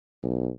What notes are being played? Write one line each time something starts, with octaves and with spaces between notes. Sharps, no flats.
B1